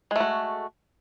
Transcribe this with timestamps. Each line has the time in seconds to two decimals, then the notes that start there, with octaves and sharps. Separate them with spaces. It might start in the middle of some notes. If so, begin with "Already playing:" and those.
0.11 G#3
0.16 A3
0.20 F#4